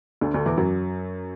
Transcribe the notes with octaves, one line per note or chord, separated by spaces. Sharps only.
D2 D3
D2 D3
E2 E3
F#2 F#3